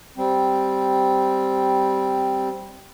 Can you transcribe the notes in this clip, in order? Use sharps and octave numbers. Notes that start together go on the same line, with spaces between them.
G3 C4